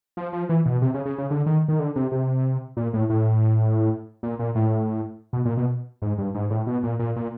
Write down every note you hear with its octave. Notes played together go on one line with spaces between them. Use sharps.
F3
F3
E3
B2
C3
C#3
C#3
C#3
D3
D#3
D#3
D3
C3
C3
A#2
A2
A2
A#2
A#2
A2
B2
A#2
B2
G#2
G2
G#2
A2
B2
A#2
A#2
A#2